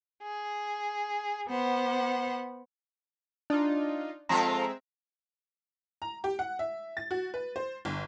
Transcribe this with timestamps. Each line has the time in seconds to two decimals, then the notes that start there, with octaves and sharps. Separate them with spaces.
0.23 G#4
1.49 B3 C5 F#5
3.50 D4 D#4 F4
4.29 F3 G#3 C4 F4 A4 E5 A#5
6.02 A#5
6.24 G4
6.39 F#5
6.59 E5
6.97 A6
7.11 F#4
7.34 B4
7.56 C5
7.85 G1